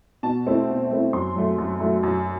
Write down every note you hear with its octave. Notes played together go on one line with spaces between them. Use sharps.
B2 A5
A3 C4 E4
B2
A3 C4 E4
F#2 C6
F#3 A3
F#2
F#3 A3
F#2